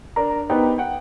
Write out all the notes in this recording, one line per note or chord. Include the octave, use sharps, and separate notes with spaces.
D4 A#4 A#5
B3 D#4 G4 B4 C5
F#5 G5